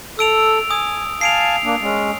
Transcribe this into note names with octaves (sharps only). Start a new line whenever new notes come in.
A4 E6 D7 F7
G#5 D#6
F5 G#5 A5 C7 D7 F7
A#3 D4
G#3 C#4